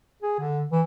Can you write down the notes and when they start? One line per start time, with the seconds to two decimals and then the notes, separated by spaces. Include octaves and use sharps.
0.22 G#4
0.39 D3
0.72 E3